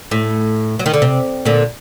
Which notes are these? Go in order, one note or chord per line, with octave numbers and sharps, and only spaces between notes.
A2
F#3
D#3
D3
C3
A#2 D3